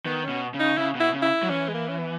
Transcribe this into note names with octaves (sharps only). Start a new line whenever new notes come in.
D#3 B3
B2 C#4
C#3
D#4
C#3 E4
B2 E4
C#3
E4
F#3
E3 C#4
G#3
A#3
C#4
B3